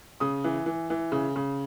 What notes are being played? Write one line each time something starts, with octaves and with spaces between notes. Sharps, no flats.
C#3 D#6
E3
E3
E3
C#3
C#3